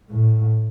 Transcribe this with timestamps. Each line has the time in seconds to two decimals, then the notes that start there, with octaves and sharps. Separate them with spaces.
0.10 A2